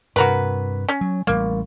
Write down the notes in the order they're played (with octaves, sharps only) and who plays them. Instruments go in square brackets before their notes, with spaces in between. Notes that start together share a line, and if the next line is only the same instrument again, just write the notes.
[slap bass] G2 C3 [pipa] F#4 A#4 B4
[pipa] C#4
[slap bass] F#3
[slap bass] A1 G3 [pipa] A#3